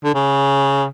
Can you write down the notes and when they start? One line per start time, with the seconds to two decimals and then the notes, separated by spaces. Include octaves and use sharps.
0.04 D3
0.15 C#3